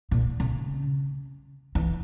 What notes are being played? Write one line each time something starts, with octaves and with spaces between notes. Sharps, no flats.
A#2
C#3
E3